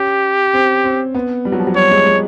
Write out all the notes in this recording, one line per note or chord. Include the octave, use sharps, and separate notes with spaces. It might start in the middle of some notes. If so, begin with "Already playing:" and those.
Already playing: C#4 G4
C4
C4
B3
G3
F#3
F3
F#3
G3 C#5
G#3
G#3